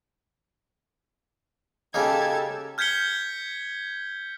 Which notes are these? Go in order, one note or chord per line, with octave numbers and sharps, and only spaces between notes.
C#3 A#3 D#4 G4 A4 A5 G#6
F6 G6 G#6 B6 C#7 G7